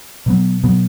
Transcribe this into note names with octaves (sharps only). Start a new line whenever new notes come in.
B2 F#3 B3
B2 F#3 B3